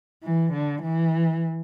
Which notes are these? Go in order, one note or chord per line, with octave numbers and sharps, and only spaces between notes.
E3
D3
E3